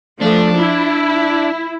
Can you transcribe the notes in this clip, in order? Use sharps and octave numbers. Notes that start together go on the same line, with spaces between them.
F3 A3 D4
E4